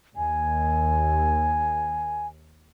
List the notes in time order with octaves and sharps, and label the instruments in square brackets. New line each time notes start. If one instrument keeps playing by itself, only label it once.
[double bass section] D#2 [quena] G#5